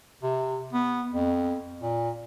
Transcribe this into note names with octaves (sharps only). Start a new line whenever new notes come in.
C3
B3
F2
A#2